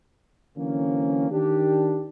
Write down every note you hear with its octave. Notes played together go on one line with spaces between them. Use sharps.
D3 E3 F#3 A#3 C4 C#4
D#3 D4 G4